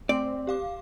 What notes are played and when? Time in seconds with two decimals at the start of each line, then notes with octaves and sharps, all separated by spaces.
0.09 A3 C4 D5
0.47 G4 F5 D6